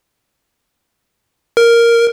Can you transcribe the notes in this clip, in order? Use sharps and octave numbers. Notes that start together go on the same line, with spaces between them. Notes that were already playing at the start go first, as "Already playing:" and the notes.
A#4